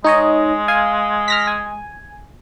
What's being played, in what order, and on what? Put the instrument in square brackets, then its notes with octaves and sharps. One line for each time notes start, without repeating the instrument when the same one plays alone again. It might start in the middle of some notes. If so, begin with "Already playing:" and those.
[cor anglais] G#3 [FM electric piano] D#4 C#5 D#5
[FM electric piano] F5 G#5
F6 A#6 B6
G#5